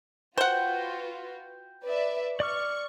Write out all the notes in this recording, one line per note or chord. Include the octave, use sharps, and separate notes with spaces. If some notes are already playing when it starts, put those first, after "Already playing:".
F4 F#4 B4 C5 F#5 G5
B4 D5 E5
D5 C#6 D6 F6